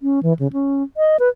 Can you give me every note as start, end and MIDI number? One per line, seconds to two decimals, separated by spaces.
0.01 0.20 61
0.23 0.33 52
0.39 0.48 49
0.53 0.83 61
0.97 1.17 75
1.20 1.29 71